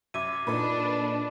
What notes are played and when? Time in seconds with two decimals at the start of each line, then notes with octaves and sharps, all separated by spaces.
0.14 F#2 E5 D6 G#6 D#7
0.47 A#2 D4 D#4 A4 B4